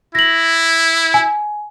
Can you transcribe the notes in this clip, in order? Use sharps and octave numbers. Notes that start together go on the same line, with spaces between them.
E4 A#6 F#7
G#5